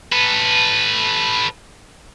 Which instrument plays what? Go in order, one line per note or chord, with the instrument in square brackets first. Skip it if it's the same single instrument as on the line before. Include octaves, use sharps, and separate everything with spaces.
[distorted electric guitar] A4 B4